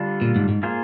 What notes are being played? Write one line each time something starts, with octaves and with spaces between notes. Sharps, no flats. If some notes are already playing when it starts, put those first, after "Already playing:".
Already playing: D3 G3 D4 F4
A#2
G#2
G#2
A#3 F4 G#4 C5